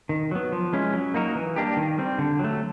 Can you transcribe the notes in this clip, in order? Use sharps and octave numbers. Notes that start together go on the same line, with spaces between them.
D#3
F#3 B3
F3
G#3 C#4 E4
F#3
A#3 D#4 F#4 A#4
E3
G3 A#3 D4 G4
D#3
G3 C4
D3
F#3 A3